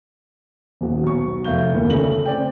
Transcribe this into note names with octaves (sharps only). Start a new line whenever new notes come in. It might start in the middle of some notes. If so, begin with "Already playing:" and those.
D#1 F#4
B1 C#6
F1 E5 F5 G6 G7
G1 D2 D#3 A#3
C#3 A3 D5 F#7
C4 D5 G5